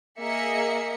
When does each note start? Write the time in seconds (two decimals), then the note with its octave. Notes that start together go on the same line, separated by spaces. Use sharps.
0.20 A#3 G#4 D#5 E5 C#7